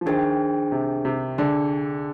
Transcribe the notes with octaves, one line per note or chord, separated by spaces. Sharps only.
F3
D#3 D4 G#4 C5 G5
C3
C3
D3 D4 G#4 D5